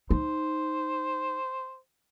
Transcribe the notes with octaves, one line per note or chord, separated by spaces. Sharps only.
D#4 C5